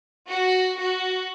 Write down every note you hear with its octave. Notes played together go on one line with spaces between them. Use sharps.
F#4
F#4